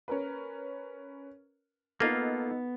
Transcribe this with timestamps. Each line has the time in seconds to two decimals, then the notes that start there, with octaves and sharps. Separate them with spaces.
0.08 C#4 A#4 B4
2.00 A#3 B3 D#4 F4 A4